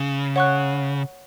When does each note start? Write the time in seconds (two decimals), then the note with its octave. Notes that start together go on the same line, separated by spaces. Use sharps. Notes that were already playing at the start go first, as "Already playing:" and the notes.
Already playing: C#3
0.36 C#5 F#5 C#6 F#6